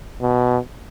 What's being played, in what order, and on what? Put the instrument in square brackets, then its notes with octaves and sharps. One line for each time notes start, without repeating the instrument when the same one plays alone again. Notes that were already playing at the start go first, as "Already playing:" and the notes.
[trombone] B2